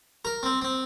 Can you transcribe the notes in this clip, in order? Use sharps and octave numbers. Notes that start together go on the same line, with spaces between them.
A#4
C4
C4